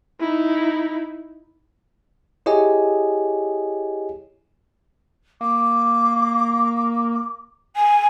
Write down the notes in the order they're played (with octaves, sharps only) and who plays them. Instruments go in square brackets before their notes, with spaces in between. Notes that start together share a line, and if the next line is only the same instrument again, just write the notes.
[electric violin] D#4 E4
[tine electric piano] E4 G4 G#4 C#5 D#5 G#5
[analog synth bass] A#3 [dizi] D6
[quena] G#5